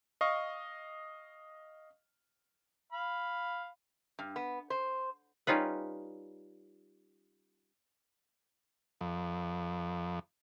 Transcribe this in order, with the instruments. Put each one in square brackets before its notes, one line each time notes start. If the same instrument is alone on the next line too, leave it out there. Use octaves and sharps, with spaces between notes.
[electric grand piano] D#5 F5 C#6
[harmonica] F5 B5
[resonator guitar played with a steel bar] G2
B3
C5
[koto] G3 C#4 D#4 F4 B4
[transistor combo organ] F2